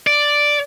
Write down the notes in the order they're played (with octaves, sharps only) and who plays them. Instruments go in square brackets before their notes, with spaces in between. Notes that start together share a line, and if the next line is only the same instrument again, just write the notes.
[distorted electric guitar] D5